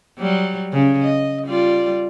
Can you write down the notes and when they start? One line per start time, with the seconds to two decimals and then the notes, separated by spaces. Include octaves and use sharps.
0.19 F#3 G3
0.73 C#3
1.03 D#5
1.45 G3 F4 D5